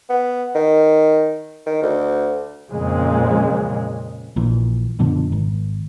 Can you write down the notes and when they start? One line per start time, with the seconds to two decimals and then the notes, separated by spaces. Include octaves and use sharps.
0.10 B3
0.55 D#3
1.66 D#3
1.82 D2
2.70 F2 A#2 C#3 G#3
4.36 A#1 A#2 E3
4.99 F#2 B2 D3 F3
5.32 G#1